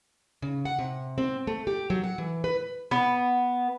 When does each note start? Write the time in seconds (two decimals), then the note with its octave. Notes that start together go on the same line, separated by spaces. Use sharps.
0.42 C#3
0.65 F#5
0.79 C3
1.18 C4
1.47 A3
1.67 G4
1.90 F#3
2.04 F#5
2.18 E3
2.44 B4
2.91 B3